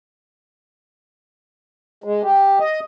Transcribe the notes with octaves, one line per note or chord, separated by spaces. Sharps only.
G#3
G4
D#5